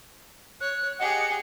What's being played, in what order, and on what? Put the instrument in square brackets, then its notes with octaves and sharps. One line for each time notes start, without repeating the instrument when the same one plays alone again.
[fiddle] C#5 [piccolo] F#6
[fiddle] G4 G#4 [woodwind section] D#5 F#5 [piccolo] C#7